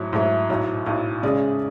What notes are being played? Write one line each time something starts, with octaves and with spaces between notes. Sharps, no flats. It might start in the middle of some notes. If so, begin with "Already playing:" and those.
Already playing: G#2 F#3 A3 E4
G#2 F#3 A3 E4
B1 A2 F#3
B1 A2 F#3
C#3 G#3 C#4 G#4 D5